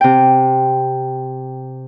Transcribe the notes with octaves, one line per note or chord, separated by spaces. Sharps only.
C3 G5